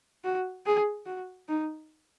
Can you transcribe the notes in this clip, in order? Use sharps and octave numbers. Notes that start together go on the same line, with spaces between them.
F#4
G#4
F#4
D#4